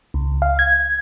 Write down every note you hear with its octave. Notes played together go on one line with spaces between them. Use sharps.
C#2
F5
G#6